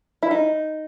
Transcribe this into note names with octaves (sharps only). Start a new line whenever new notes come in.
E4
D#4